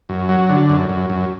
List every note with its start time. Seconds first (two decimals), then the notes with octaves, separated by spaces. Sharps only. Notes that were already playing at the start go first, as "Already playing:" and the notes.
0.09 F#2
0.29 F#3
0.49 D3
0.69 F#2
0.89 F#2
1.10 F#2